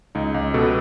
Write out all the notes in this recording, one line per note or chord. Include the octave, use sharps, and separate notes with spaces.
C#2 D#4
C#2
B2 A4
B4